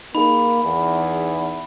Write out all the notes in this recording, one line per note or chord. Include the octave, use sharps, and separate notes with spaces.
A#3 D#4 G#4 B5
E2